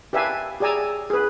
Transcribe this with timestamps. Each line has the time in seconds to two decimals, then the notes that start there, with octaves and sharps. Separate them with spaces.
0.13 G4 B4 E5 F5 G#5 A5
0.60 G4 G#4 D5 G#5 A#5 E6
1.10 G#4 B4